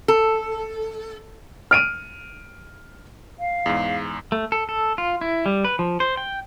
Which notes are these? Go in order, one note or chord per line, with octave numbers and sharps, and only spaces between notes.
A4
F6 D7 D#7
F5
E2 G#2
A3
A4
A4
F4
E4
G3
B4
F3
C5
G5